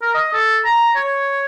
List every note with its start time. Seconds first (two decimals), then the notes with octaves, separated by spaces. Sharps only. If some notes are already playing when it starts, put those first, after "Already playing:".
0.02 A#4
0.15 D#5
0.33 A4
0.65 A#5
0.96 C#5